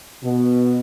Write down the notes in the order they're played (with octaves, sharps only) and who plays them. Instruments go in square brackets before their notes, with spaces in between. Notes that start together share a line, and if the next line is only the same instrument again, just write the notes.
[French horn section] B2